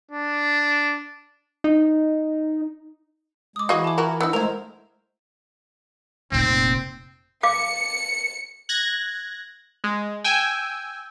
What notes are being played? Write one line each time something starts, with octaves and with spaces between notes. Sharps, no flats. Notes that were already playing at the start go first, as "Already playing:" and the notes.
D4
D#4
G#3 D6 D#6
E3 E4 F#4 G#4 D#5 F5 C#6 D#6
A5 D6
F4 F#4 A#4
B3 D#4 F#5 E6
G#3 A3 E4 A#4 C5 F7
F1 A#2 C4
F5 D6 C#7
F#6 G#6 A#6
G#3
G5 G#5 E6